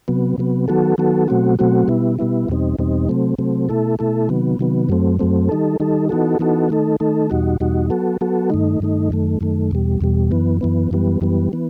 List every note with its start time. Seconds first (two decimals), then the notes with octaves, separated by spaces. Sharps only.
0.08 C3 F#3 B3
0.38 C3 F#3 B3
0.68 D#3 F#3 B3 F#4 A4
0.98 D#3 F#3 B3 F#4 A4
1.28 B2 F#3 A3 C4 F#4
1.59 B2 F#3 A3 C4 F#4
1.88 B2 G3 B3 E4
2.19 B2 G3 B3 E4
2.48 E2 B2 G3 C4 D#4
2.79 E2 B2 G3 C4 D#4
3.09 C3 F#3 A3 C4
3.38 C3 F#3 A3 C4
3.69 B2 A3 E4 A4
3.99 B2 A3 E4 A4
4.29 C3 D#3 F#3 B3
4.59 C3 D#3 F#3 B3
4.89 F#2 F#3 A3 C4
5.19 F#2 F#3 A3 C4
5.49 D#3 G3 D#4 A4
5.80 D#3 G3 D#4 A4
6.09 E3 B3 D#4 F#4 A4
6.39 E3 B3 D#4 F#4 A4
6.69 D#3 A3 D#4 A4
7.00 D#3 A3 D#4 A4
7.30 E2 B2 G3 D#4 F#4
7.60 E2 B2 G3 D#4 F#4
7.90 F#3 B3 F#4 A4
8.21 F#3 B3 F#4 A4
8.50 G2 D#3 A3 D#4
8.80 G2 D#3 A3 D#4
9.10 F#2 D#3 A3
9.41 F#2 D#3 A3
9.71 E2 B2 G3
10.01 E2 B2 G3
10.31 F#2 E3 B3
10.61 F#2 E3 B3
10.91 F#2 E3 G3 B3
11.21 F#2 E3 G3 B3
11.53 E3 B3